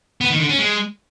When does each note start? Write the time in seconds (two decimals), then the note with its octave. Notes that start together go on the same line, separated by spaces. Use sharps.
0.21 B3
0.30 D#3
0.40 D3
0.49 C#4
0.59 G#3